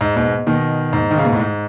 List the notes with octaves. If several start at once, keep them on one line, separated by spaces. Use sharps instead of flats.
G#2
G#2 B2
B2 D#3
G#2
D#3
C#3
B2
A2
G#2